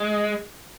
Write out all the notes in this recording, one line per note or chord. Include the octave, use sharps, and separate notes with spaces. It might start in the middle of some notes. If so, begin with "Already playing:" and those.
Already playing: G#3